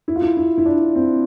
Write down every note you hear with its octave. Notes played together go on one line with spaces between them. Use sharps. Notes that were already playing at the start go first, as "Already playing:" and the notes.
E4
F4
E4
E4
E4
D4
C4